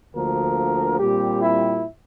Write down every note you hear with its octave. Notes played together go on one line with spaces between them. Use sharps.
D2 D3 F3 A#3 A#4
A#2 G3 C4 G4
E4